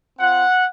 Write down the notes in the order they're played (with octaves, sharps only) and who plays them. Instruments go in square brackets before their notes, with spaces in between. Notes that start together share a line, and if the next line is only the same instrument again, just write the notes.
[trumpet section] C4 F4 F#5